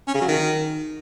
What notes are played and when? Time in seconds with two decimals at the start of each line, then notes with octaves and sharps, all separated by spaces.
0.08 C#4
0.14 C#3
0.21 F#3
0.28 D#3